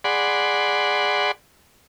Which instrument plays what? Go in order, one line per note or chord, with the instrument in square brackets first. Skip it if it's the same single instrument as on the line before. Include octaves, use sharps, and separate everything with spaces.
[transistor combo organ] G#4 D5 F#5 B5 C6